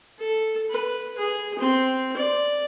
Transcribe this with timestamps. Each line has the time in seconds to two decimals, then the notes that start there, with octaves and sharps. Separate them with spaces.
0.19 A4
0.70 B4
1.18 G#4
1.59 C4
2.17 D5